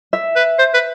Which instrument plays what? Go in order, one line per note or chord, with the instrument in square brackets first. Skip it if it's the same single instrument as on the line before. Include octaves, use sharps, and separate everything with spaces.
[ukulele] E5
[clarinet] B4
C5
B4